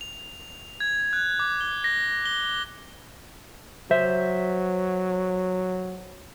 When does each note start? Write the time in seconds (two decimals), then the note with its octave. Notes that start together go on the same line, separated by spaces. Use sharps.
0.01 F7
0.80 G#6
1.13 F#6
1.39 D6
1.61 G7
1.84 A#6
2.26 G7
3.91 F#3 C5 E5